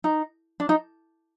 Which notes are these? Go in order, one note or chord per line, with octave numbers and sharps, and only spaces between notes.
D#4
D4
D#4